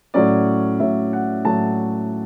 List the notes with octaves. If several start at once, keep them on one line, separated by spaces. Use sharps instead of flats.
A2 F#3 C#4 D5
A2 F#3 C#4 E5
F#5
A2 F#3 C#4 A5